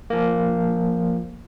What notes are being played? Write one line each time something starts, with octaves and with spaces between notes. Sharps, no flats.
F3 A#3